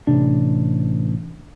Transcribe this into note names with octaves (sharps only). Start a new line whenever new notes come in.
A1 C3 D4